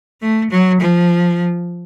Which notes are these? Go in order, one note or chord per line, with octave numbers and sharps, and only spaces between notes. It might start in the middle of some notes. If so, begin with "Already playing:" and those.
A3
F#3
F3